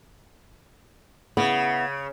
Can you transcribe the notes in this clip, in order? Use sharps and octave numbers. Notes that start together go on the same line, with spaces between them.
C#3 B3 E4